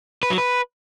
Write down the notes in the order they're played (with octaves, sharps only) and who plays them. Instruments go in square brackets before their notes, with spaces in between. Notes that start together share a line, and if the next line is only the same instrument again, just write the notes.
[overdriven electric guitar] B4
F#3
B4